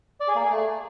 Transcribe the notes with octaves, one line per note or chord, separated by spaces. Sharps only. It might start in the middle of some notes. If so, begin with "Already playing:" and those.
D5
G#4
A#3
G#4
A3